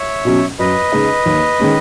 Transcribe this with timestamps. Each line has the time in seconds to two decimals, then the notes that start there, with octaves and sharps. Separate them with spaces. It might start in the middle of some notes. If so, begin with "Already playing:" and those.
Already playing: C#5 E5
0.25 B2 F#3 C#4
0.59 F#2 B4 D#5
0.92 C#3 G#3 D#4
1.26 D#2
1.59 D#3 G#3 C#4